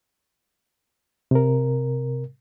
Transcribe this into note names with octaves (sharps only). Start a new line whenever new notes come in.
C3 A#4